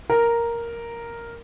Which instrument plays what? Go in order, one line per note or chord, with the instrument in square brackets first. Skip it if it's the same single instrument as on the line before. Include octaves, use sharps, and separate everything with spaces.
[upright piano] A#4